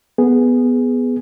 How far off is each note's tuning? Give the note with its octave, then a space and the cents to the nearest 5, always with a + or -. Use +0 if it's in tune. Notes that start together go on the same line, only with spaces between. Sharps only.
B3 +0 G#4 +0